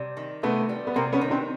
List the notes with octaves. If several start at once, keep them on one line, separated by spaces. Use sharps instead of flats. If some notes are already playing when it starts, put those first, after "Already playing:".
Already playing: C3 G3
D#3
C3 A3 B3
G3
B3
C3 A#3 C4
B3 C#4
D#3
C4 D4